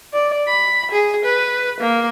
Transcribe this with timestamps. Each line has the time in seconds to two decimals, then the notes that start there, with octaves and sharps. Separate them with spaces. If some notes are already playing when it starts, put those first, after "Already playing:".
0.13 D5
0.48 B5
0.92 G#4
1.25 B4
1.80 A#3